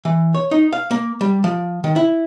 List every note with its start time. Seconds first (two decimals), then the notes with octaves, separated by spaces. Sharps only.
0.05 E3
0.34 C#5
0.51 D#4
0.73 F5
0.91 A#3
1.21 G3
1.44 F3
1.84 D#3
1.96 E4